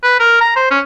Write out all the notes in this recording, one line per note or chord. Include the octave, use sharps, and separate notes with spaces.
B4
A#4
A#5
C5
C#4